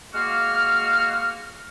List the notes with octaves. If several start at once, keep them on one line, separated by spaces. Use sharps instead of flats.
G#3 A#3 F#4 F5 F6